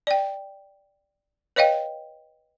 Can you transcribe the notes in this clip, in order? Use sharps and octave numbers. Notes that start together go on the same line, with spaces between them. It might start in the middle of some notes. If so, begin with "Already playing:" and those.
D5 G5
B4 C#5 D#5 F5 G5